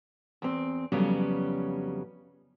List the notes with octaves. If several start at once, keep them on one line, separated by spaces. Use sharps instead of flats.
E2 C4
F2 C#3 F#3 G3 B3 C#4